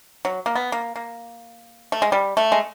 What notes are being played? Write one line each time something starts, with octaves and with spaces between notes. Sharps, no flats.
F#3
A#3
B3
A#3
A#3
A3
G#3
G3
A3
G#3